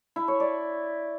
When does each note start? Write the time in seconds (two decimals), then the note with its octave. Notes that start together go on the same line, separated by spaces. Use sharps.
0.16 E4
0.28 C#5
0.40 D5